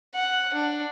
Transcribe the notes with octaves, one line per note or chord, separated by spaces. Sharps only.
F#5
D4